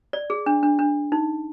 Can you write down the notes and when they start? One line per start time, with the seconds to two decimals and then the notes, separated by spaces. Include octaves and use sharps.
0.13 D5
0.30 G#4
0.46 D4
0.63 D4
0.79 D4
1.12 D#4